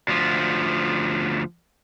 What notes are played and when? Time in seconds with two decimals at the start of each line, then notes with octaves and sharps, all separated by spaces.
0.08 D2 F3